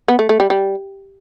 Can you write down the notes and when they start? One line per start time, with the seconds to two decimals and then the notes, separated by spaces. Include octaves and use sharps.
0.08 B3
0.19 A3
0.29 A3
0.40 G3
0.50 G3